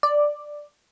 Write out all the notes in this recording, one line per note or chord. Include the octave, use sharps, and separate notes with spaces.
D5